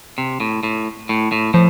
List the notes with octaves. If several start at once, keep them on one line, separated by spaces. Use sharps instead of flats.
C3
A2
A2
A2
A2
A2 F3